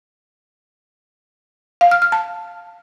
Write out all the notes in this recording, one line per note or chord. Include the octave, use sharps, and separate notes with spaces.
F5
F6
F6
A5